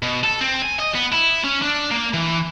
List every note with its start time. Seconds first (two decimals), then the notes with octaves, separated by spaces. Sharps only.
0.03 B2
0.24 A4
0.41 C4
0.62 G#5
0.79 D#5
0.95 B3
1.12 E4
1.44 C#4
1.62 D4
1.91 A#3
2.14 E3